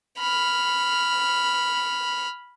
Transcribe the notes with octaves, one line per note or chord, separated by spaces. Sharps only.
B5 F6